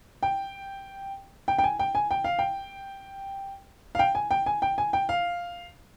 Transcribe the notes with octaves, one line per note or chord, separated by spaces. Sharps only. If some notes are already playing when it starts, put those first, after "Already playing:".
G5
G5
G5
G#5
G5
G#5
G5
F5
G5
F5
G5
G#5
G5
G#5
G5
G#5
G5
F5